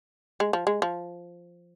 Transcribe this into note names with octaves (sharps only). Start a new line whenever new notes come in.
G#3
F3
G#3
F3